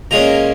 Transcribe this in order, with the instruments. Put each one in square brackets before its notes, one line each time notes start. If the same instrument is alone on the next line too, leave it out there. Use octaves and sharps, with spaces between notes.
[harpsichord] A#2 G#3 C#4 A#5